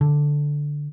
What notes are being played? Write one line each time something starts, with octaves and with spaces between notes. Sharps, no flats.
D3